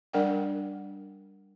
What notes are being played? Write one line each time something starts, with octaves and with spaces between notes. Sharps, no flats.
G3 D4 A#4 D5 F#5 G5